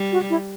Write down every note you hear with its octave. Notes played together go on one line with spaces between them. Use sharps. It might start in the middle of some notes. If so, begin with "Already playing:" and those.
Already playing: G3
F#4
E4